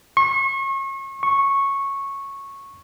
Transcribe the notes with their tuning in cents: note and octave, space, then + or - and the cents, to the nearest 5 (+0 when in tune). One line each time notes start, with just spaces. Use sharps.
C#6 -35
C#6 -10